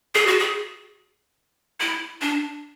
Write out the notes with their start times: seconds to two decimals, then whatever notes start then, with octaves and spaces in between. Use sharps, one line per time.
0.15 G#4
0.27 F#4
0.39 G#4
1.80 E4
2.21 D4